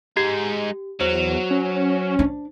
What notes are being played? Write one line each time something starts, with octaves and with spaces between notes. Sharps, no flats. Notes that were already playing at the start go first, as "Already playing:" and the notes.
G#3 D#4 G4
E2 F#3 C5
C#4
D4